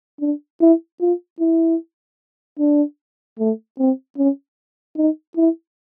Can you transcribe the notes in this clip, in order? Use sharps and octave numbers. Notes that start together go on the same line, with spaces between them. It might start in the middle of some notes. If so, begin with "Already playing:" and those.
D4
E4
F4
E4
D4
A3
C4
C#4
D#4
E4